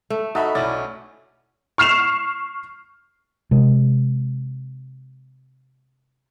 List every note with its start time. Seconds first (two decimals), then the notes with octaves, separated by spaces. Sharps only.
0.10 A3
0.35 D#4 F#4 A4 D#5 E5 B5
0.55 B1 C#4 E4 D5
1.78 C#6 F6 C7 E7 F7
3.51 C3 G#3